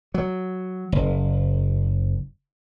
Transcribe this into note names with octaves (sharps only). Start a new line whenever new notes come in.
F#3
F#1